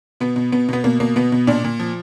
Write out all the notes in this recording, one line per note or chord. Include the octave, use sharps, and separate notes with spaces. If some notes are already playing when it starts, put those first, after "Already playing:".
B2 B3
B2
B2 B3
B2 B3
B2 A#3
B2 A#3
B2 B3
B2
A#2 D4
A#2
F3